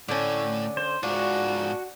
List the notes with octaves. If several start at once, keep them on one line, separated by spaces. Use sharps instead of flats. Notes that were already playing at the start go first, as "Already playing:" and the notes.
A2 D3 A3 C#4
C5
G#2 D4 F4 F#4